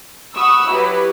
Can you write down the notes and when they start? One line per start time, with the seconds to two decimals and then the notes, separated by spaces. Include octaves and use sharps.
0.34 F#5 B5 C#6 D#6 E6
0.68 F#3 E4 G4 B4